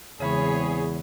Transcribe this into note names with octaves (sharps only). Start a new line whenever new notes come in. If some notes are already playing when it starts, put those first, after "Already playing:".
E2 C#3 E3 G#3 C4 G#4 C#5 B5